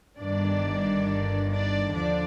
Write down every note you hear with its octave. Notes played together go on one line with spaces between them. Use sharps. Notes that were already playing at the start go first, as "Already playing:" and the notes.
G1 G2 D#3 D4 D5
D4 D5
D#2 D3 F3 D4 D5